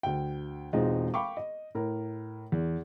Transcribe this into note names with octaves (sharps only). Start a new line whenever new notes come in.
D2 G5
E1 G#3 C4 D#4 F4
F5 G5 B5 C#6 D6
D#5
A2 A#4
E2